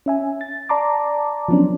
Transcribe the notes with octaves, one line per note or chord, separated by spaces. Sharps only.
C#4 E5 G#5
A6
D5 A5 A#5 C6 D6
F3 F#3 B3 C#4 D4